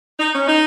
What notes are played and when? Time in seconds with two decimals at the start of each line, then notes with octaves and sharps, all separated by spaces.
0.19 D#4
0.34 C#4
0.48 D#4